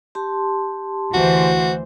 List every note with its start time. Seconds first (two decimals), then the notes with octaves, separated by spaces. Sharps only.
0.15 G4 A5 C6
1.14 D2 E3 F#4 C5